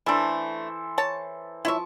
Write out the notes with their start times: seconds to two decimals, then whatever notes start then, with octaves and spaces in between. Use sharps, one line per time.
0.06 E3 A3 D4 A4 C5
0.98 C#5 A5
1.65 F3 E4 C#5 E5 C#6